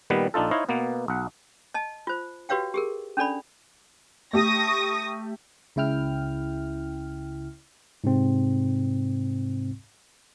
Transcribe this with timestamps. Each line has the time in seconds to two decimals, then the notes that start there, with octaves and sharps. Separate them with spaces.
0.10 A#2 D#3 G3 B3 B4
0.34 A#1 D4 D#4 F4 A4
0.51 D#4 E4 C5 C#5 D#5 F5
0.69 B2 A#3 B3
1.08 B1 F#5
1.74 D#5 A5
2.07 F4 C5
2.49 F#4 G4 B4 C#5 F5 G5
2.74 G4 G#4 A#4
3.17 C#4 D4 A4 D5 B5
4.33 A3 G4 C#6 D#6 A#6
5.76 C#2 C#3 E4 G5 F6
8.04 G#2 C3 C4